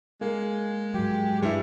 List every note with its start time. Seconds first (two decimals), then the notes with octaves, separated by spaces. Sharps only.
0.21 G#3 A#3
0.94 G#2 F#3 G4 G5
1.43 G2 G3 E4